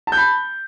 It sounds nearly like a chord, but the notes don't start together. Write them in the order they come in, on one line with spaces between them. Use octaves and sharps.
A5 G6 B5